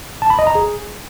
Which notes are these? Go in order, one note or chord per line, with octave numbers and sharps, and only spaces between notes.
A5
B5
D#5
A#5
G#4